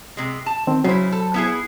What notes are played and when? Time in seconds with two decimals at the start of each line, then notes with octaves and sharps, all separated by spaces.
0.17 C3 G#3
0.46 A5
0.67 D#3 C4
0.84 C#3 F#3 E4 C5
1.12 A4
1.34 B3 E4 G#4